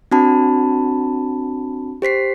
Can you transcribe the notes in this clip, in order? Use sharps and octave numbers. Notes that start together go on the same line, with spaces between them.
C4 D4 F#4 A5 B5
G4 C5 B6 C7